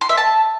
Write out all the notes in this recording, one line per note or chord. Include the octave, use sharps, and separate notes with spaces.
C6
E5
A5